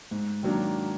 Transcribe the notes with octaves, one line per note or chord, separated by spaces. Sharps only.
G#2
D#3 F#3 A#3 D4